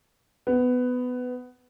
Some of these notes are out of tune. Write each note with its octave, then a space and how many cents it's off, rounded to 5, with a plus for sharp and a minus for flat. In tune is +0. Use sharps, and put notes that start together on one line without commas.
B3 +15